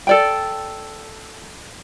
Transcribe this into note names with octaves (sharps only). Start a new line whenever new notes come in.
A4 D5 G5